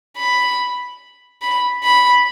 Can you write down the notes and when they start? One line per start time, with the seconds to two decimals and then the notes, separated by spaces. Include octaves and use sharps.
0.17 B5
1.42 B5
1.83 B5